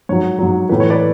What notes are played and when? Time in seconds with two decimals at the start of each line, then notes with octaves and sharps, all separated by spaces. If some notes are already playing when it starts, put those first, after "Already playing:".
0.09 G#2 F#3 C#5
0.39 G#2 F#3
0.69 A2 E3 B4
0.80 C#5
0.90 B4 D5